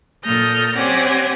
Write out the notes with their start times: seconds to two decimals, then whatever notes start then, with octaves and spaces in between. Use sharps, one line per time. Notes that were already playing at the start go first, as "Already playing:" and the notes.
0.24 A#2 A4 D#6 F6 G6 A#6
0.77 C4 C#4 G4 D5 F#5 G#5